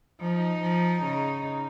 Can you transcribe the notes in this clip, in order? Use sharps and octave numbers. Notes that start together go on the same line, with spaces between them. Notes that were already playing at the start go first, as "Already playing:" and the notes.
F3 D#4
F3
C#3